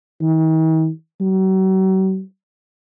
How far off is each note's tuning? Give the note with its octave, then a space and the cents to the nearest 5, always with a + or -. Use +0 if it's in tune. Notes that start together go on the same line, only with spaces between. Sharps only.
D#3 +45
F#3 +40